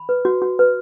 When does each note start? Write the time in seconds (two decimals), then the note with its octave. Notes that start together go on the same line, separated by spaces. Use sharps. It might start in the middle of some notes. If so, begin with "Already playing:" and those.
Already playing: B5
0.09 B4
0.25 F#4
0.42 F#4
0.59 B4